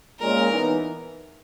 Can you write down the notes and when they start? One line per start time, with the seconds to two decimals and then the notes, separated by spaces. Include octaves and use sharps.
0.20 A#2 G#3 C#4 A#4
0.48 E3 B3 D#4